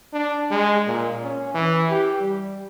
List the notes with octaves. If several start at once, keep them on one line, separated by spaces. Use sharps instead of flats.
D4
G#3
A#2
C#4
E3
G4
G3